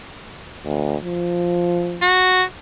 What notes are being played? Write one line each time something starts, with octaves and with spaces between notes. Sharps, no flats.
D2
F3
F#4